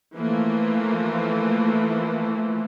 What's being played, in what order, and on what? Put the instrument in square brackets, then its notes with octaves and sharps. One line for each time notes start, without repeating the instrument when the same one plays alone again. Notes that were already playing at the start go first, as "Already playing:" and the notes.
[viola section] E3 F3 A3 A#3